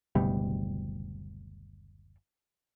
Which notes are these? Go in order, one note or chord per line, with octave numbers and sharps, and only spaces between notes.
F#1 D2 B2 G3